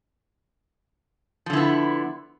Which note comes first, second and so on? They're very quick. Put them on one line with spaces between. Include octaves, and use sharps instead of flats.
F3 D3 E4 B3